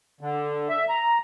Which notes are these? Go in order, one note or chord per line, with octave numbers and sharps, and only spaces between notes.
D3
E5
A#5